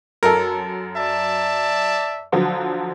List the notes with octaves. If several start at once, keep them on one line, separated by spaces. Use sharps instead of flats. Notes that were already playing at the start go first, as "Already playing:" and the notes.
F#2 A4 A#4
D5 E5 A5
D3 F3 F#3